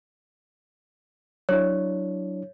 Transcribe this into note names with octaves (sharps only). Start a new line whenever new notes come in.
F#3 D4 E4 C#5